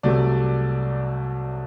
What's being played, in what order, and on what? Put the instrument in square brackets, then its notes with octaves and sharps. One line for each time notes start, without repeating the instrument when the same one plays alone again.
[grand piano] C2 C3 F#3 A3 D5